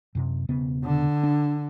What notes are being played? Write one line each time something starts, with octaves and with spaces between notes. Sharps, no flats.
F#2 C3
E1 C#3 B3
D3
D4